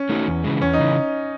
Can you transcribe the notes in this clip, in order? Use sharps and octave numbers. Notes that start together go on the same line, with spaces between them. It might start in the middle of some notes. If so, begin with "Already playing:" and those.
Already playing: C#4
A3 D#4 F#4
E2
C#3 E3 G#3
E2 C#4
D#4
C#3 E3